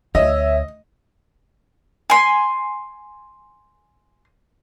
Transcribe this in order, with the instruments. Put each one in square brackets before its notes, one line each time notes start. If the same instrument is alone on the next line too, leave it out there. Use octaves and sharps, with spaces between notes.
[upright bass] D2 [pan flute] C#5 [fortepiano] D#5 [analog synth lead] E5
[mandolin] G#5 C6